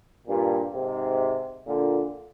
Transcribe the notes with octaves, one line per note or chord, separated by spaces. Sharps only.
G2 A#2
G#2 C3
A#2 D3